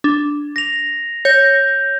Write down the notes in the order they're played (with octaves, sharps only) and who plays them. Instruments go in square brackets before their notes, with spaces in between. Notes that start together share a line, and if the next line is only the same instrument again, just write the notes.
[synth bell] D4
[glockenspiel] A#6 F7
[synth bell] C#5 A#6 [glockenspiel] G6